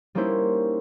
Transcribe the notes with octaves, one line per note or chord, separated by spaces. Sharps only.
G3 A#3 C#4 D#4 E4 C5